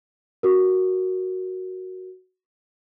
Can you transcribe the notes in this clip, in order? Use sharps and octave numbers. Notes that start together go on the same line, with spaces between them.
F#4 A#4